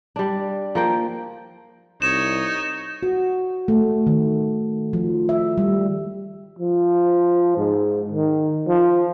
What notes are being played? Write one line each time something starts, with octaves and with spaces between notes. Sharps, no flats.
G3 D4
F3 A#3 G5
C2 D#4 C#5 E7
F#4
A3
D#3
F3
E5
G3
F3
G#2
D#3
F3